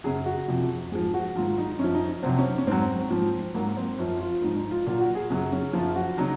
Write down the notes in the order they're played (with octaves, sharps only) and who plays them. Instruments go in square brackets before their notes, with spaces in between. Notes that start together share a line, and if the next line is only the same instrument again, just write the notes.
[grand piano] F#2 C#3 F#3 G#4
F#4
F2 C3 F3
G#2 F3 G#4
F#4
G#2 D#3 F#3 F4
D#4
F#2 F3 C#4
D#4
F2 C3 F#3 C4
C#4
C#4
G#2 F#3 C4
G#2 F3
G#2 F#3 A#3
C4
F#2 F3 C#4
F4
G#2 F3 D#4
D#4
F4
A#2 F#3 F4
F#4
G#4
F#2 C#3 F#3 G#4
C#4
F#2 F3 F4
F#4
C#3 F#3 D#4